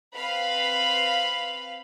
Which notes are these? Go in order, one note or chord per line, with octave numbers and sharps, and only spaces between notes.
C4 B4 F5 B5